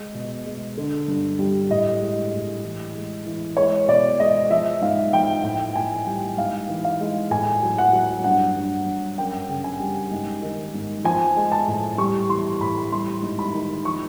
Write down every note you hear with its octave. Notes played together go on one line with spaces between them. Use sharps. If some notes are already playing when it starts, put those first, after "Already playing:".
Already playing: G#3
B2
G#3
D3
G2
G3
A2 D#5
G#3
A2
E3
G#3
E3
G#3 C#5
B2 D5
G#3 D#5
F3 E5
G#2 F5
F3 G5
A2 G5
A2 G#5
G3 G5
G#2 F5
E3
F5
G#3
A2 G#5
F#3
F#5
F#3
G2 F#5
G2
G2
F#2 G5
C#3
G#5
G3
G#2
D#3
G#2
F3 G#5
G#3
A5
A2
G3 C#6
E3 C6
A2 B5
G3 C6
G#2
B5
D#3
F3 C#6